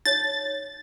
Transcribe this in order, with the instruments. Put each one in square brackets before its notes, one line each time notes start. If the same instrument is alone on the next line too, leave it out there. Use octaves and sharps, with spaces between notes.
[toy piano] D#4 C#5 [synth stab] A6